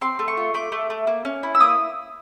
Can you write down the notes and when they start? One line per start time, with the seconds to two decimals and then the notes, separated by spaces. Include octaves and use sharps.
0.01 C4 C6
0.19 A3
0.28 C#6
0.37 F4
0.54 A3 D6
0.72 A3
0.90 A3
1.07 A#3
1.25 C#4
1.43 E4
1.55 E6
1.60 A#3 D#6